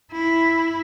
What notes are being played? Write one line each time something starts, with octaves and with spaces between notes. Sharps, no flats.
E4